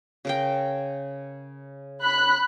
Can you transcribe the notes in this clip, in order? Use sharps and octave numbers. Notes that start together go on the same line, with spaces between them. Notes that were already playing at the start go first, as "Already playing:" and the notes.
C#3 A#4 G5
B5 F#6